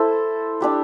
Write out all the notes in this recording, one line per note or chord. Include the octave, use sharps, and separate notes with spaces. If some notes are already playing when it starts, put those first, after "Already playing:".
Already playing: E4 A4 C5
D4 G4 B4